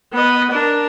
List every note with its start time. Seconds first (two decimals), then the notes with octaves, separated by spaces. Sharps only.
0.13 B3 D#5
0.50 D4 A#4